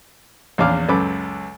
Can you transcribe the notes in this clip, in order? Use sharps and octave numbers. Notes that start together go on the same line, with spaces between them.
A#1 E2 C#4 F5 D6 F6
C#2 F#2 A4 B4 B5 D6